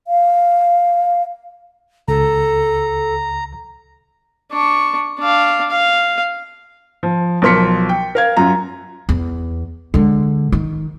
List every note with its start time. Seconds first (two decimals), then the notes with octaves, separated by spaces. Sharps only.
0.08 F5
2.08 C#2 A4 A#5
4.52 D4 C#6
5.19 D4 F5
5.70 F5
7.03 F3
7.42 B1 F3 A#4 C6 B6 C#7
7.89 G5
8.15 A#4 F5 G#6
8.37 F#2 F4 A#5
9.09 E2
9.94 D3 G#3
10.52 D#3